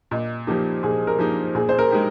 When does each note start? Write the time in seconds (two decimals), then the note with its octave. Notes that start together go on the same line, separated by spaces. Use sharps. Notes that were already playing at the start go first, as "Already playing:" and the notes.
0.11 A#2 D#5
0.47 F3 A#3 D#4 G4
0.83 A#2 G#4
1.07 A#4
1.19 F3 A#3 D#4
1.55 A#2 G#4
1.69 C5
1.79 A#4
1.91 G#3 D#4 G4